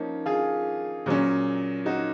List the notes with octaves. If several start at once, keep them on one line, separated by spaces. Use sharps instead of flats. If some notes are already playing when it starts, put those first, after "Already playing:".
Already playing: F3 A#3 C#4 D#4
F4 G#4
A#2 F#3 C#4
D#4 F#4